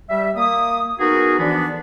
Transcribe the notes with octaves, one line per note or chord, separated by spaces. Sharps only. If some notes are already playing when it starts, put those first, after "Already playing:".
G3 E5
A#3 D#6
B3 D#4 F#4 G#4 A#4
D3 E3 F3 B3 D4